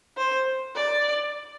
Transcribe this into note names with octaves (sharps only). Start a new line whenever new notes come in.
C5
D5